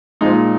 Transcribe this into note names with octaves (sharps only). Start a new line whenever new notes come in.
A#2 F3 G#3 D#4